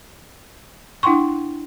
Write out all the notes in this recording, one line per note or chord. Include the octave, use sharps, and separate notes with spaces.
D4 E4 F#5 G5 C6 C#6